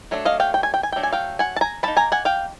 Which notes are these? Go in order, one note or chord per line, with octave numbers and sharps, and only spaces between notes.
F#3 A3 D4
D#5 F5
F5 G5
G5
G#5
G5
G#5
F#3 A3 D4 G5
G#5
F5 G5
F#5 G#5
A5
G#5 A#5
F3 A#3 D#4 A5 B5
G#5 A#5
F#5 G#5
F5 G5